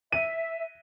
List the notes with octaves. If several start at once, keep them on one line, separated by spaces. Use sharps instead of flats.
E5 D#7